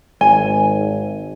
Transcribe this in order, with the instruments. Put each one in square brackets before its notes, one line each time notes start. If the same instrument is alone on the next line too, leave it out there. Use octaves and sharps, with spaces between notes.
[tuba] G#1 [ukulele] G#5